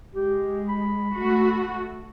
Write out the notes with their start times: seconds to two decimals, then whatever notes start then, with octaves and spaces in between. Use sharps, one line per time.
0.15 G#3 G4
0.68 B5
1.14 A3 F#4